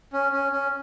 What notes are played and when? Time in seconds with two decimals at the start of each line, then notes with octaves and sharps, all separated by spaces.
0.13 C#4
0.32 C#4
0.52 C#4